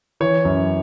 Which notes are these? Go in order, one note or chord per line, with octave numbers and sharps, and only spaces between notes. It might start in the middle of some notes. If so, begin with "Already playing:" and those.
E3 C#5
F#2